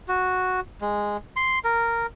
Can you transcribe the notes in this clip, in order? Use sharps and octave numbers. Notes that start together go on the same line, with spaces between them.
F#4
G#3
C6
A#4